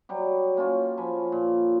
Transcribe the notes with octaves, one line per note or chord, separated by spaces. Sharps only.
F#3 G3 G4
A#3 C#4 F4
F3 G#5 B5
A#2